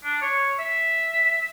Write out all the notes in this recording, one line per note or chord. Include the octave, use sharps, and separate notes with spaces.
D4
C#5
E5